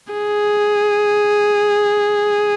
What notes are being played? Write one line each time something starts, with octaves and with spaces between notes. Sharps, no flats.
G#4